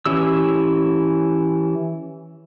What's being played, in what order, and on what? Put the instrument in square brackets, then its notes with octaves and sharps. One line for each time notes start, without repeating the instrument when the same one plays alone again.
[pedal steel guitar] E3 C#4 E4 G4 E6